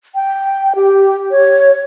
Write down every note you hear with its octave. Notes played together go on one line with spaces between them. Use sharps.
G5
G4
C#5